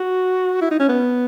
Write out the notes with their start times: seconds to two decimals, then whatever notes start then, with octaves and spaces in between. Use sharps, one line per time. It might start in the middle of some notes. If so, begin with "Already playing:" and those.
Already playing: F#4
0.61 E4
0.71 D#4
0.79 C#4
0.89 B3